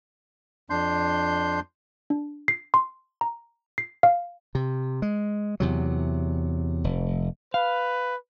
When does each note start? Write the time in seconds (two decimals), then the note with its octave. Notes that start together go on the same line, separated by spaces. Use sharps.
0.70 F2 D4 C6 G6
2.10 D4
2.48 C7
2.74 C6
3.21 A#5
3.78 C7
4.03 F5
4.55 C3
5.02 G#3
5.60 E2 C3 F#3
6.84 F1
7.54 B4 F5